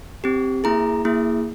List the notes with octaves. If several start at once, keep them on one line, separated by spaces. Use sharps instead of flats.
C4 G4
A#3 E4 G#4 A#5
A#3 E4 G#4